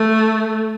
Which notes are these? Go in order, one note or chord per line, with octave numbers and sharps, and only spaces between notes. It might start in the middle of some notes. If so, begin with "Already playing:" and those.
Already playing: A3